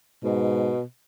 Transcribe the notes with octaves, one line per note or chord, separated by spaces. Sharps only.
G#2 B2